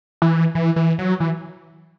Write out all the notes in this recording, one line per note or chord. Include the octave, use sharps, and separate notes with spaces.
E3
E3
E3
F#3
E3